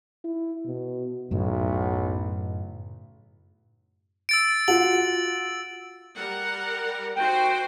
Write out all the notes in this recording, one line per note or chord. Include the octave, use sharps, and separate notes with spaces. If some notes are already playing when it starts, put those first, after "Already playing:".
E4
B2
B1 F#2 A2 C#3
E6 A6 D7
F4 F#4 F#7
G3 A#4 F#5
D#4 F#4 C5 G5